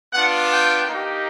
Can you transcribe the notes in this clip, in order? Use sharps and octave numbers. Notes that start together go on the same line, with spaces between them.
B3 D4 F4 F#5
G5
A#3 D#4 G4